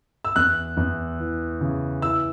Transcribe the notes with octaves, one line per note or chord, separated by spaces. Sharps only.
E6
E2 F#6
E2
E3
C#3
E3 E6